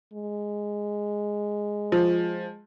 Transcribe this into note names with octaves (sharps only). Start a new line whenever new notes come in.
G#3
F3